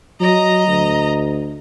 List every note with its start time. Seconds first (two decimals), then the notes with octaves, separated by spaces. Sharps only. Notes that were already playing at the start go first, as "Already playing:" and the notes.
0.21 F#3 D#5 A#5
0.67 D2